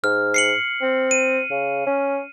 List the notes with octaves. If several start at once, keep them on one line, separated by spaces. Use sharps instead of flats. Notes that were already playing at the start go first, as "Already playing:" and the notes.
G#2 F6
C7 C#7 F#7
C4
D#7
C#3
C#4